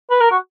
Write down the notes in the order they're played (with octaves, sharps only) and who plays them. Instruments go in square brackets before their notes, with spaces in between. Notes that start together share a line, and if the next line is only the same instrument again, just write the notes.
[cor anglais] B4
A#4
F#4